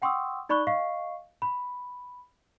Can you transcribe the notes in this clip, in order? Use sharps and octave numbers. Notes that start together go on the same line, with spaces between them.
F#5 G5 C6 C#6 D#6 E6
D#4 D5 B5 C#6 F#6 G7
D#5 F5 C#6 C7
B5